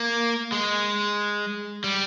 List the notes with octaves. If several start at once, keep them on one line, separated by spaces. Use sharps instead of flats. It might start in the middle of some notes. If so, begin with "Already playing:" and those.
Already playing: A#3
G#3
G3